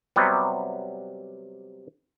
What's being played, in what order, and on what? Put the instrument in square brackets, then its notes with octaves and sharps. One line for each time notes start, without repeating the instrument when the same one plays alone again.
[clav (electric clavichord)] C3 F#3 G3 B3